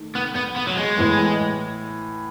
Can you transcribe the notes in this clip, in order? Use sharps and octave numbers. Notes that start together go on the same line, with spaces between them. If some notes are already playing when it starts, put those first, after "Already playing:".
Already playing: D#3 A3
B3
B3
B3
F#3
G#3
A2 E3 B3